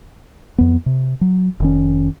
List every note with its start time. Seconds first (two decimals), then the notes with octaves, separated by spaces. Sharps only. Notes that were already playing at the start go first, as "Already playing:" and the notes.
0.58 F2 B3
0.86 C3
1.21 F#3
1.60 F1 D#3 C#4